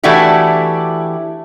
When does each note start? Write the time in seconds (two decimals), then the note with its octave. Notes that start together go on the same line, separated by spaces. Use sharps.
0.03 E3 A3 D4 E4 F#4 G4